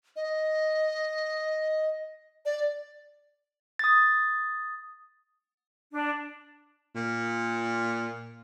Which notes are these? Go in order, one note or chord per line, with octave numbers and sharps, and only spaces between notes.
D#5
D5
D#6 A6
D4
A#2